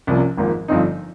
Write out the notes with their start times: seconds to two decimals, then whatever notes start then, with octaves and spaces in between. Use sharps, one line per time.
0.07 C2 C3 F3 A#3 C#4
0.38 G#1 G#2 F3 A#3
0.68 G1 G2 F3 C4 D#4